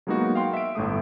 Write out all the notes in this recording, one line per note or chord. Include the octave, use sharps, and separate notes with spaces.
F#3 G#3 A#3 B3 D#4 F#4
F5 G5 C6
E5 D7
G1 A2 A3 D#6